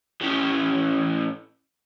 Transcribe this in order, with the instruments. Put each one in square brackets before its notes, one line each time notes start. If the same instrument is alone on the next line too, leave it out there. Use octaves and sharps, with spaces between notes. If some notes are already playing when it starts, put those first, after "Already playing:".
[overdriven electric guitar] A2 C#4